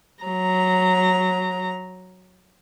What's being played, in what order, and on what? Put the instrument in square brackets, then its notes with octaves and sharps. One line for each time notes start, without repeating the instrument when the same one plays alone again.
[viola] F#3 A#5